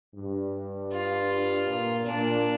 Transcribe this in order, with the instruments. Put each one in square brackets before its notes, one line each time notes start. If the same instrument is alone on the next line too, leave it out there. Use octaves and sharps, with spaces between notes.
[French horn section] G2
[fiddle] F4
[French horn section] A#2
[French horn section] A#2 [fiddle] D4